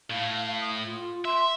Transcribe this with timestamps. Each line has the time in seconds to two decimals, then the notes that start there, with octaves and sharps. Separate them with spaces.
0.10 A2 F5
0.59 D#6
0.85 F4
1.25 E5 C6